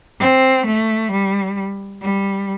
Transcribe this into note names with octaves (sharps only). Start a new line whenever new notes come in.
C4
A3
G3
G3